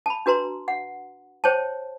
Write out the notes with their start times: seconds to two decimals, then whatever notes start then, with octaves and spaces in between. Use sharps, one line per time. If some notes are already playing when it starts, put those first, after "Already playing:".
0.06 A5 B5
0.26 D4 F#4 B4 A#5 C6
0.68 F#5
1.44 C5 C#5 G5 A5